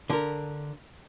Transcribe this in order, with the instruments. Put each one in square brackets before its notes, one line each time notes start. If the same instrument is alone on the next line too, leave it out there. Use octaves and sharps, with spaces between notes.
[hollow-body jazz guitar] D3 A#4